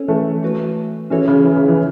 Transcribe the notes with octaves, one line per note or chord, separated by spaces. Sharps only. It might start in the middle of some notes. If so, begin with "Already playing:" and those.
Already playing: C#4 A4 C#5
E3 A3
A3 F#4 B4
E3 C#4 F#4 A4 C#5
C#3
E3
C#3
E3